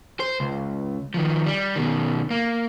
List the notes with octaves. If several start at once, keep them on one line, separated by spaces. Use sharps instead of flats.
C5
C#2
D#3 F3
G3
B2 D#3
A#3